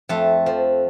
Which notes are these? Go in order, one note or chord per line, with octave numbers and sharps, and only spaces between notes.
F2 A3 A4
F3